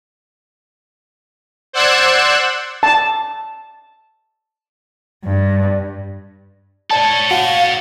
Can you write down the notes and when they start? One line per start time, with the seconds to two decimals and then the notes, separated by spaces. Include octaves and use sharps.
1.73 C5 D5 F#5 E6 F#6 G#6
2.83 A5
5.25 G2
6.91 A4 C#5 D5 A5
7.31 F#4 F5 F#5